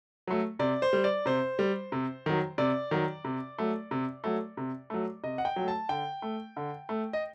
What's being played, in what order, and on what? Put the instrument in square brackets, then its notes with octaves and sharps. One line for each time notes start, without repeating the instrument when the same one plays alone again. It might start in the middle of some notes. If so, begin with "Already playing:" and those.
[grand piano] F#3 A3
C3 D5
C5
G3
D5
C3 C5
G3
C3
D#3 F#3
C3 D5
D#3 F#3
C3
F#3 A3
C3
F#3 A3
C3
F#3 A3
C3 D#5
F#5
G5
F#3
A3
A5
D3 G5
A3
D3
A3
D#5